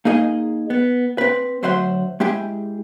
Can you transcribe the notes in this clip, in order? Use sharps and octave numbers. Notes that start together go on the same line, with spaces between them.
A#3 D#4 G#4 D#5
B3
C4 B4
D2 F#3 C5 E5 F#5 C6
G#3 E4 G4 G#4